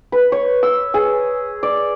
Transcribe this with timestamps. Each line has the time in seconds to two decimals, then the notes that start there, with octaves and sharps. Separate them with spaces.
0.12 B4
0.32 C#5
0.63 E6
0.94 G#4
1.63 D5